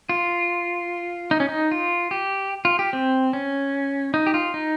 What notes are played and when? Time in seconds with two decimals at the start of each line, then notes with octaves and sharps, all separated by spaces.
0.09 F4
1.31 D#4
1.40 C#4
1.49 D#4
1.71 F4
2.11 G4
2.65 F4
2.79 G4
2.93 C4
3.33 C#4
4.14 D#4
4.27 G4
4.34 F4
4.54 D#4